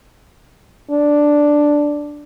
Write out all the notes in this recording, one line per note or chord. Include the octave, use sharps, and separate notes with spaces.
D4